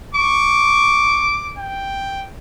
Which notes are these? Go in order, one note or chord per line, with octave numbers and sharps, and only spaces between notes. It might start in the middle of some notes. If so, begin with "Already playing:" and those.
C#6 D6
G5